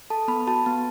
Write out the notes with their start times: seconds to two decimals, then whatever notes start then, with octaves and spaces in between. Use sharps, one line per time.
0.10 A4 A5
0.28 B3 B5
0.47 F#4 A5
0.66 B3